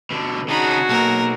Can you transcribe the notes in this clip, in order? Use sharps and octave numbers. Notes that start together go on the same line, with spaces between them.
B2 D3
C#3 D4 D#4 F#4 G#4 B5
B1 A#3 A#4